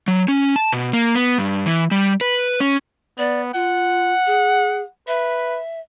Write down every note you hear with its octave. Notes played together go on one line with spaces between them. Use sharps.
F#3
C#4
A5
B2
A#3
B3
G2
E3
G3
B4
C#4
B3 D5
F4 F#5
G#4
B4 E5